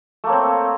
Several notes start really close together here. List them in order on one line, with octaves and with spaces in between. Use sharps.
A3 A#3 C#5 C4